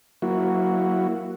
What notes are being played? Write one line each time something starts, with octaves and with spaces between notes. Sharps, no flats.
F#3 A#3 E4 F#4